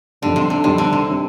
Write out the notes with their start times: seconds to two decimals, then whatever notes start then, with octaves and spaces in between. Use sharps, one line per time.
0.22 F2 D3 D#3 G3
0.36 C3
0.50 D3
0.64 F2 C3 D#3 G3
0.78 D3
0.93 C3
1.09 D#3 G3 C4